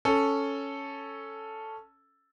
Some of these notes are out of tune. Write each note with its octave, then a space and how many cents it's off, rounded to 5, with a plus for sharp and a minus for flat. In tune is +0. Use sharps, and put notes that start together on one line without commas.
C#4 +0 A4 +0